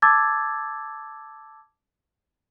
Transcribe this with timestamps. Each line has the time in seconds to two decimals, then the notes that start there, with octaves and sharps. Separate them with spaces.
0.02 A5 D6 E6 G#6 A6